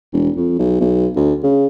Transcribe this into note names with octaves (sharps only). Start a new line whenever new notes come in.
E1
F2
B1
B1
D2
C#3